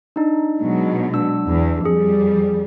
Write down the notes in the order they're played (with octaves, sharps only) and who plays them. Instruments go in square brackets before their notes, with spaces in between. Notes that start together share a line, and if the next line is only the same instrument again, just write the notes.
[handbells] D4 D#4
[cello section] B2 F#3 G#3
[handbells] D4 E6
[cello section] E2
[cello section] F2 G3 [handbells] G#4